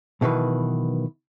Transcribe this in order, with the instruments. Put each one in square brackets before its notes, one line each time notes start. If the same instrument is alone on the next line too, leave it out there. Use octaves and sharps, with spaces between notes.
[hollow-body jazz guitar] B1 B2 D#3 E3 B4